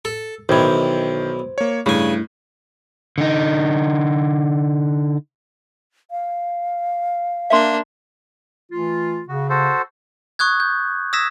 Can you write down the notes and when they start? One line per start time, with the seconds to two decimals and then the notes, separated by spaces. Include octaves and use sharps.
0.05 A4
0.49 B1 D#3 E3 C5 G5 G#6
1.58 A#3 C#5
1.86 G2 C#3 A3 E4 G#5
3.18 D3 D#4
6.11 F5
7.50 A#3 D4 E5 C6
8.71 E3 A3 F4
9.29 C#3 F#4
9.49 F#4 A4 C5
10.39 C#6 D#6 F#6 G#6
10.60 G6
11.13 D#6 E6 G#6 A#6 B6 E7